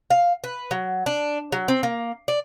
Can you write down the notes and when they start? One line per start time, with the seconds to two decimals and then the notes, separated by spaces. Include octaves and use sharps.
0.10 F5
0.44 B4
0.71 F#3
1.06 D4
1.52 F#3
1.68 C4
1.83 A#3
2.28 D5